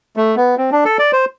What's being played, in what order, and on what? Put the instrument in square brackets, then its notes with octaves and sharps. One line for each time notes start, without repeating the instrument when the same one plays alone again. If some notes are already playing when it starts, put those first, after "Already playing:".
[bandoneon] A3
B3
C4
D4
A4
D5
C5